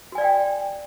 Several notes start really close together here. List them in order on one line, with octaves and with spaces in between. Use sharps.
F#4 G#5 D5 F5 G5